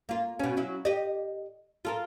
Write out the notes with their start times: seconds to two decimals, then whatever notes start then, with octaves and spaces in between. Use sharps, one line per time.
0.09 A#3 F4
0.39 B2 C#4
0.57 F#3 C#4 E4
0.85 G4 D#5
1.85 F4 A4 A#4